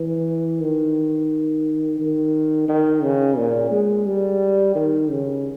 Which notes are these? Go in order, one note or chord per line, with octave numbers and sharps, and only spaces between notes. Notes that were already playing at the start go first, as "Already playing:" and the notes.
Already playing: E3
D#3
D#3
D#3
C#3
A#2
G#3
G3
D#3
C#3